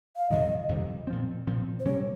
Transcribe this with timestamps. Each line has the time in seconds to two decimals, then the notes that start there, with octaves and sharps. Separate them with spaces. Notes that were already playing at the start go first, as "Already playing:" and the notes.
0.16 F5
0.30 F2 C3 D#3 G3 D#5
0.69 F2 C3 D#3 G3
1.07 A#2 F3 C4
1.47 A#2 F3 C4
1.80 C5
1.85 C3 G3 A#3 C#4 C#5